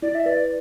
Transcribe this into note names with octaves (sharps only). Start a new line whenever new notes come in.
E4 D5
E5
B4 D5